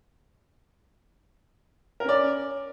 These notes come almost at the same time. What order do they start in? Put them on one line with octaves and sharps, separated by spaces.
A#4 C#4 D5